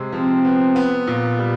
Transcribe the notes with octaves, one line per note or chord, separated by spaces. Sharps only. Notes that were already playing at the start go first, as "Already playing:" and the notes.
Already playing: C3 G#3
F3 C4
B3
B3
A#2
G3